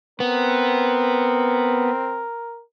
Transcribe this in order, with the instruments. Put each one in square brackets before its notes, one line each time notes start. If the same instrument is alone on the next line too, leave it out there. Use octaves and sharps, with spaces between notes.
[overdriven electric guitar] B3 [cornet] C4 [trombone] A#4